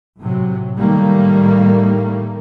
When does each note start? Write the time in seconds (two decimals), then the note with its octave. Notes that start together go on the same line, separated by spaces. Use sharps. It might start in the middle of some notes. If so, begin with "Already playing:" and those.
0.19 A2 C3 F#3
0.76 A2 D#3 G3 A3 A#3